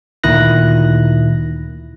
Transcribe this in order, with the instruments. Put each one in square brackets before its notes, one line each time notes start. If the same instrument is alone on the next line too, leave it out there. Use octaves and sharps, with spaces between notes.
[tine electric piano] D2 A#2 D#3 E4 F#6 A#6